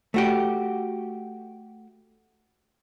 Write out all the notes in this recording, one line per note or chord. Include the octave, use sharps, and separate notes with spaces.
A3 F#4 G4